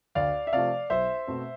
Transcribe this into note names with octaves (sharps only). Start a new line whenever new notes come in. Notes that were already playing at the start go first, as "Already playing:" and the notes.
D2 D5 F5
E5
C3 F3 A3 D5 F5
B1 C5 E5
B2 A3 C4